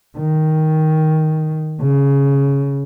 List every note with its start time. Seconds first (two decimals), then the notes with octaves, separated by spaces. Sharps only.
0.17 D#3
1.80 C#3